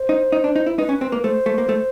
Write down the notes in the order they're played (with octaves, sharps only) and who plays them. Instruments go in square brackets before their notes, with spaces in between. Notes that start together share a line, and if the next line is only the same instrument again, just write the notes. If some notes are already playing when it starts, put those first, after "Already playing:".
Already playing: [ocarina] C5
[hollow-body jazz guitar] D#4
D#4
D4
D#4
E4
[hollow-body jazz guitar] D#4 [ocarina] B4
[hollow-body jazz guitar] C#4
C4
A#3
[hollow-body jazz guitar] A3 [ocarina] C5
[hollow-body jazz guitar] A3
A#3
A3